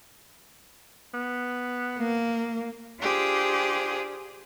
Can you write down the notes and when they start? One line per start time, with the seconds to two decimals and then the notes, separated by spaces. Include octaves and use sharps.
1.14 B3
1.99 A#3
3.00 D4 F4 G4 G#4 C5